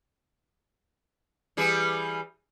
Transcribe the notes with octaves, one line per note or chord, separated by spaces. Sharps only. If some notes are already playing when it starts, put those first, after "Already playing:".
E3 G3 G#4